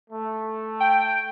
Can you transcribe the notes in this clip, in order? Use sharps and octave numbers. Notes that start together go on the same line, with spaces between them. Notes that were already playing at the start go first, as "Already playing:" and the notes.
A3
G5